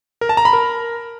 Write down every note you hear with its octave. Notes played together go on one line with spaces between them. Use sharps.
A#4
A5
A#5
B5
A#4